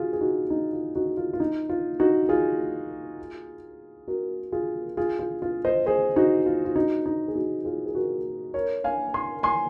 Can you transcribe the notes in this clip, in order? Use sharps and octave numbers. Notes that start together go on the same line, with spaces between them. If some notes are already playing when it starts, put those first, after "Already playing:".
Already playing: F4 F#4 G#4
G#4
D#4 F#4
D#4
F4
D#4 F#4
F4
F4
D#4
F4
D#4 F#4
F4 G#4
F#4 A#4
F4 G#4
F4 G#4
F4
F4
C5 D#5
G#4 C5
D#4 F#4
F4
F4
D#4 F#4
D#4
G#4
D#4 F#4
F4 G#4
G#4
F#4 A#4
A#4 C#5
F5 G#5
G#5 C6
G#5 C6